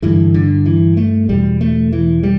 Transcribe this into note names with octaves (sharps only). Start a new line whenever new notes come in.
G2 D3 E3
D3
E3
A3
E2 B2 G3
A3
E3
G3